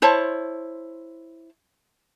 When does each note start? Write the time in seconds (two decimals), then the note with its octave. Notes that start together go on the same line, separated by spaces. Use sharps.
0.02 E4 C5 C#5 A5